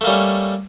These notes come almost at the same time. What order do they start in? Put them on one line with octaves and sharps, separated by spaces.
A3 A#3 G3 C#4